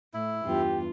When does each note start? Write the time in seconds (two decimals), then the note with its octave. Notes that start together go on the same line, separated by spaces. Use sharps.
0.14 A2 E4
0.45 E2 G2 F4 G4